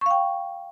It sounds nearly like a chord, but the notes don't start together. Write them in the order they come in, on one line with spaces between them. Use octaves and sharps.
C#6 F5 G5